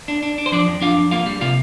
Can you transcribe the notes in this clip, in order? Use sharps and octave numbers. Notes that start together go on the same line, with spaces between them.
D4
D4
D4
C5
F3 D4 D5
F2
D4 F4 F5
F2
A#3 F4 F5
G3
C3 F4 F5